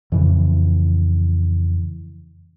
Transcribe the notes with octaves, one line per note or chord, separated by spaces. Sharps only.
F2 A2 C#3 E3